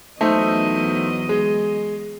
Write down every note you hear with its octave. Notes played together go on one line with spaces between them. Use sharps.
E2 F#3 A3 D#4 C5 D#5
G#3